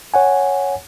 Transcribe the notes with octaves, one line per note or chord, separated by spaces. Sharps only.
C#5 F#5 G#5